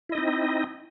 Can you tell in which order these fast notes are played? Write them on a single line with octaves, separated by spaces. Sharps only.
E4 D#5 D#4 C4